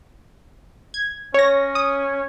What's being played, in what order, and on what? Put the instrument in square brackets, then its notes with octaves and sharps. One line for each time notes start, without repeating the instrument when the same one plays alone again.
[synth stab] G#6
[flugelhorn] C#4 [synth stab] C#5 A#6
[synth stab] D#6